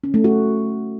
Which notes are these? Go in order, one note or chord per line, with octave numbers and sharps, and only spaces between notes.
C#4
A3
F#4